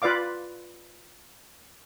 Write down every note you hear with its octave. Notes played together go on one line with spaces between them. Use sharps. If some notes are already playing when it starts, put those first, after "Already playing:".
F4 B4 D5 F5 D6